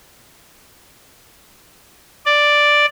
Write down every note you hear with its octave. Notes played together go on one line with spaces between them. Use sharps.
D5